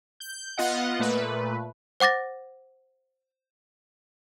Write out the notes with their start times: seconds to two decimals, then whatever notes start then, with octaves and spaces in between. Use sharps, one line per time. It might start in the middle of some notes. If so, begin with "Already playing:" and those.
0.20 G6
0.58 B3 F4 D#5 F#5
0.99 A#2 A3 B4
2.00 C5 F#5 D6 A6 A#6